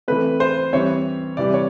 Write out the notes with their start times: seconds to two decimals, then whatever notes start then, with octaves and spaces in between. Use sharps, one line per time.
0.08 E3 A3 C4 B4
0.40 C5
0.73 E3 G3 C4 C#5
1.37 C3 E3 G3 D5
1.54 C#5